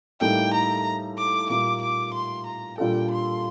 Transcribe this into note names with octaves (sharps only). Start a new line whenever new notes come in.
A2 G3 A#3 D#4 A4 G5
A#5
D6
A#2 G3 A#3 D6
D6
C6
A#5
A#2 G3 D4 F4 A4 G5
C6